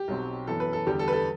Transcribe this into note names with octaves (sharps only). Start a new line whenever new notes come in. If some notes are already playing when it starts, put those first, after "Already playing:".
Already playing: G4
B1 B2 F#3 C4
F#2 E3 B3 A4
B4
A4
E2 D3 G3 G4
A4
B4
A4